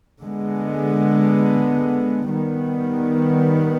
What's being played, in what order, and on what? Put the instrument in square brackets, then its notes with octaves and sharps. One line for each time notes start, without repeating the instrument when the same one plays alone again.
[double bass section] D3 G#3 B3
D#3 G3 B3